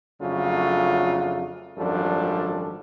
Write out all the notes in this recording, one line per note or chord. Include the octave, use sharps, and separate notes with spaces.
F2 C#3 F#3 A3 D4 F4
G#1 F#2 F3 G3 D4 A4